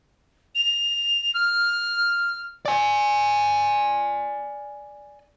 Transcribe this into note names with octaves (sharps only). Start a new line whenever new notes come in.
F7
F6
D5 G#5